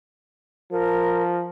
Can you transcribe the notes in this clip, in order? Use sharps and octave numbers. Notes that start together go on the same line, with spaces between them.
F3 A#4